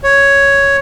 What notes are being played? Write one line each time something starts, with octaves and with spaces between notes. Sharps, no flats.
C#5